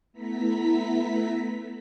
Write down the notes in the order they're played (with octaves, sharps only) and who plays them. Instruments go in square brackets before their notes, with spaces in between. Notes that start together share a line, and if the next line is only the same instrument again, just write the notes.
[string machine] A3 B3 E4 A#5 B6